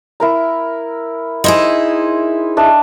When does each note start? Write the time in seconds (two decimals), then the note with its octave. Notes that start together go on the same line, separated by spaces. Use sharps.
0.20 E4 A#4 A#5
1.44 D#4 E4 G#4 C5
2.57 D4 D#5 E5